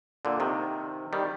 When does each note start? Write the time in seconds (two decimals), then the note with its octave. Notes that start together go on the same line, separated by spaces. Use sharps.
0.25 A#2 D3
0.40 C3 D#3
1.13 D#3 G3